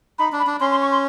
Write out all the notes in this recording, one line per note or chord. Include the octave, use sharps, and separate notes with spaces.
D#4 B5
D4
B5
D4
C#4 C6
C6
C#6
C6